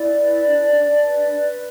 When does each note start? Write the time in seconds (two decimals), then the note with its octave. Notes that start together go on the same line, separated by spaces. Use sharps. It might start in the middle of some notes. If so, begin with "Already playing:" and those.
Already playing: E4 D5
0.15 B4
0.44 D4
0.73 D4
1.03 B4
1.32 B4